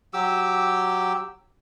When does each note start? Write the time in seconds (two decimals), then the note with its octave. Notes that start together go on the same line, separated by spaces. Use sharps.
0.13 F#3 G4 D6 E6